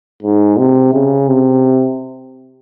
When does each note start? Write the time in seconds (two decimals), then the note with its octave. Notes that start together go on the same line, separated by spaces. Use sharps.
0.23 G#2
0.58 C3
0.94 C#3
1.29 C3